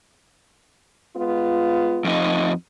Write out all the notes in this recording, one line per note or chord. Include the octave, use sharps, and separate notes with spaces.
G#3 B3 F4
F2 D#4